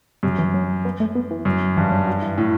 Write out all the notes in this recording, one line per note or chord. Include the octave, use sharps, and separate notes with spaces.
F#2 C3
E3
F#3
B3
A3
B3
E3
F#2
G2 E3
F#3
F#3
E3
A2